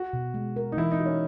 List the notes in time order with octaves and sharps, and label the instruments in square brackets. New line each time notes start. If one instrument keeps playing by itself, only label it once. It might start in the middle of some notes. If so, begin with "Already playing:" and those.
Already playing: [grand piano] F#4
[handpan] B2
G#3
A#4
[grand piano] D#4
[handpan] E3 [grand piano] E4
[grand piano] D#4
[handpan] F#4
[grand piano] C#4